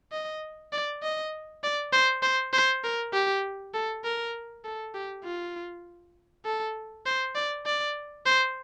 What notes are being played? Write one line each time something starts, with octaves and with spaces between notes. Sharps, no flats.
D#5
D5
D#5
D5
C5
C5
C5
A#4
G4
A4
A#4
A4
G4
F4
A4
C5
D5
D5
C5